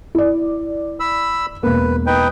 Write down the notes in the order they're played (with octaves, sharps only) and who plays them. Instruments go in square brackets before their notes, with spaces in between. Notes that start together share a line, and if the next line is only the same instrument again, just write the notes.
[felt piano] E4 D5
[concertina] B5 E6
[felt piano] E1 A#3 [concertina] B4
[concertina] D#4 B4 G5